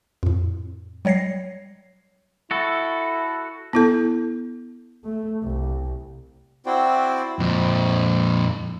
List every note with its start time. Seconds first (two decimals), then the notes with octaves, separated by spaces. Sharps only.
0.23 F2 A2
1.05 F#3 G3 C#5 A#6 C7
2.51 E4 F#4 A4
3.73 B3 E4 A4
5.04 A3
5.43 C2
6.66 C4 E4 F#4 C5 D5 G5
7.39 F2 A#2